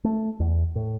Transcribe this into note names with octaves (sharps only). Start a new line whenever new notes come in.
A3
E2
A2